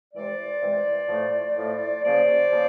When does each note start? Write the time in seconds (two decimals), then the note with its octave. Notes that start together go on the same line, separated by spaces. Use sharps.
0.14 C3 E3 G#3 C5 D5
0.62 C3 E3 G#3
1.09 A2 F3 A3
1.57 A2 F3 A3
2.03 C#3 F3 A#3 C5 D5
2.52 C#3 F3 A#3